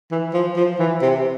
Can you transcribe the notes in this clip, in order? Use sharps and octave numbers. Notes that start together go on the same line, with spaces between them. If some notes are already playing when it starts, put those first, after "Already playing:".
E3
F3
F3
E3
C3